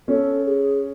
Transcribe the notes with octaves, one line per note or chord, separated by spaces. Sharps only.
C#4 A4
G#4